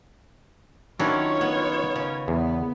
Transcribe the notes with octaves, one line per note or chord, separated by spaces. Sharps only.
D#3 F#3 C#4 D4 E4 F4 C#5
B3
C#3
E2 B3